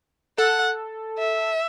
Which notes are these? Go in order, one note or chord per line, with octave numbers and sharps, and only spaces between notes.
A4 F#5
E5